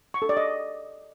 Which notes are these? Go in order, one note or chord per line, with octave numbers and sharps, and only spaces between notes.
C#6
A4
D5
D#5